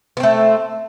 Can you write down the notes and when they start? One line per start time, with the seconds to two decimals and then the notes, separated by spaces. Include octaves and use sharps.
0.17 B3
0.20 C4
0.23 A3